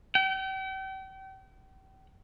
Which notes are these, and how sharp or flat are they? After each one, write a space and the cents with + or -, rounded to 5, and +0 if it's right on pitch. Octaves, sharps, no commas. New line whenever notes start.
G5 -40